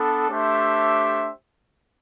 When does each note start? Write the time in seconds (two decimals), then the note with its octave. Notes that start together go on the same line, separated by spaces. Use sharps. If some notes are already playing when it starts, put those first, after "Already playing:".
Already playing: B3 D4 A4
0.29 A3 D4 G4 C5 E5